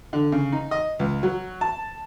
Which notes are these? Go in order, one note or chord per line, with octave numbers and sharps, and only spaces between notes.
D3
C#3
D#4
D#5
C#2
F#3
A5